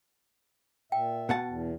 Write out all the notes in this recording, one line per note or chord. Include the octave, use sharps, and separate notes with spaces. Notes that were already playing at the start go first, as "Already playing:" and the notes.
A#2 E5 G5
B2 F#5 A5
E2